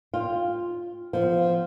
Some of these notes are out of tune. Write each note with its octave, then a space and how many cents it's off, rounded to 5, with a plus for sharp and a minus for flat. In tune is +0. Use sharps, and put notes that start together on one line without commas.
F4 +0 G5 +15
F3 -10 B3 +20